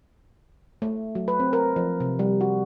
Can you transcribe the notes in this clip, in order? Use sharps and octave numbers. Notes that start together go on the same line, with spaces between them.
A3
F#3
B4
C4
A#4
F3
C3
G3
F#4